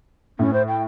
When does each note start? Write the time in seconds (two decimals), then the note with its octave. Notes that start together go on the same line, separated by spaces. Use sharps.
0.39 A2 C#4
0.53 C5
0.68 G5